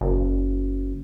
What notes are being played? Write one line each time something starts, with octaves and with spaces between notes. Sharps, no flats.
F#1